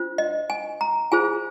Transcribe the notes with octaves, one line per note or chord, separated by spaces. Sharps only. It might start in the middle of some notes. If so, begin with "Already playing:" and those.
Already playing: D4 F4 C5
D#5
G#5
A#5
F4 G#4 C5 G#5